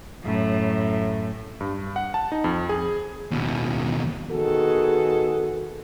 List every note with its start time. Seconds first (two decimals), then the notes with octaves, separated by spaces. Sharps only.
0.23 F#2 A2
1.61 G2
1.96 F#5
2.14 A5
2.32 D#4
2.44 F2
2.69 G#4
3.31 D#2 B2
4.31 D#3 B3 F#4 G#4 A4